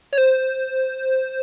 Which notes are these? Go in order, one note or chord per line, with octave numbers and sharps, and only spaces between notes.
C#5
C5